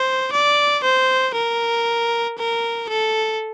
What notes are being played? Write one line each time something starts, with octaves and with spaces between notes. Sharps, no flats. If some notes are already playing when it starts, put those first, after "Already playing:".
Already playing: C5
D5
C5
A#4
A#4
A4